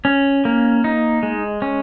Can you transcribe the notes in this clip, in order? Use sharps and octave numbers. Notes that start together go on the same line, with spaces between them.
C#4
A#3
D#4
G#3
C#4